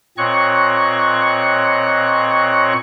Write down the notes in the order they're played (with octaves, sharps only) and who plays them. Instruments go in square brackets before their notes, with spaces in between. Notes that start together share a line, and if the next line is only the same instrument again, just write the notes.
[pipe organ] A#2 C4 C#5 D#5 C#6 F#6